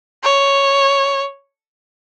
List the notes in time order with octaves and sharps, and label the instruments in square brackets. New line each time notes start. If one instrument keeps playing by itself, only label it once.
[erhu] C#5